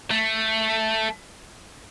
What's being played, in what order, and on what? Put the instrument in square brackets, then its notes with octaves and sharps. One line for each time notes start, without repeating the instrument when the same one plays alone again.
[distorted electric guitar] A3